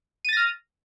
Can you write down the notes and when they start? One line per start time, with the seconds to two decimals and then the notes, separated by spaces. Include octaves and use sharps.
0.25 D#7
0.29 A6
0.33 A#6
0.37 F6